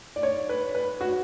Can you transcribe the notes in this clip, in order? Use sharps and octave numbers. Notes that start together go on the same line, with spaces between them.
D5
C#5
B4
B4
F#4